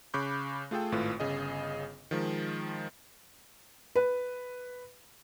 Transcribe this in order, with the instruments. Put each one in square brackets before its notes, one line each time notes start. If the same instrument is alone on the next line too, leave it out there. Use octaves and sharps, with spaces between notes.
[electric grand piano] C#3 B5 C#6 D6 F#6 G6
A3 F4 G#4 A4 G5
G#1 A2 F4 B4
G1 C#3 G#4 D#5
D#3 F3 G#3
[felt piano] B4